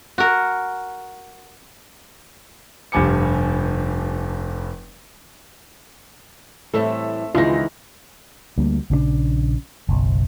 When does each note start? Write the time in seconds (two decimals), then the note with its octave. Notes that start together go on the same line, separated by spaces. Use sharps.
0.18 F#4 A#4
2.92 F1 G2 F3 G#5 D6 C#7
6.74 A2 E3 G3 A3 C4 A4 E5
7.35 C#2 D#3 E3 G#3 F4 G4 C5 A#6
8.58 D2 G3 A#3
8.90 A#1 C#3 E3 D4
9.89 F#1 B1